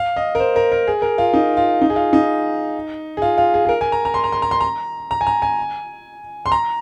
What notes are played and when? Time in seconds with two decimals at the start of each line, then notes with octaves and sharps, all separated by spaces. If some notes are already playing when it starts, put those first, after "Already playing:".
Already playing: F5
0.16 D#5
0.35 A#4
0.40 C5
0.56 A#4
0.72 A#4
0.87 G#4
1.02 A#4
1.18 F4
1.34 D#4
1.57 F4
1.82 D#4
1.90 G#4
1.96 F4
2.13 D#4
3.17 G#4
3.22 F4
3.38 F4
3.54 G#4
3.65 G#4
3.69 A#4
3.81 G#5
3.92 A#5
4.05 A#5
4.14 C6
4.24 A#5
4.32 C6
4.42 A#5
4.51 C6
4.60 A#5
5.11 A#5
5.21 G#5
5.27 A#5
5.42 G#5
6.46 C6
6.52 A#5